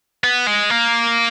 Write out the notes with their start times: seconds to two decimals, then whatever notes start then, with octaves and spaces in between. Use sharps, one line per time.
0.24 B3
0.47 G#3
0.70 A#3